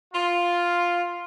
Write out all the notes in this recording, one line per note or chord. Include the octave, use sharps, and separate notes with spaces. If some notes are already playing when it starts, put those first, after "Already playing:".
F4